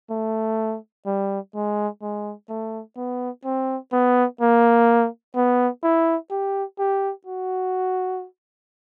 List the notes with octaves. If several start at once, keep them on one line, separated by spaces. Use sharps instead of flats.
A3
G3
G#3
G#3
A3
B3
C4
B3
A#3
B3
E4
G4
G4
F#4